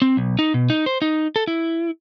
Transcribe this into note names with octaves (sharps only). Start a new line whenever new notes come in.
C4
B1
D#4
B2
D#4
C5
D#4
A4
E4